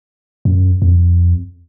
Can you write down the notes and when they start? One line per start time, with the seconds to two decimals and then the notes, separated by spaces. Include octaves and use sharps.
0.45 F#2
0.82 F2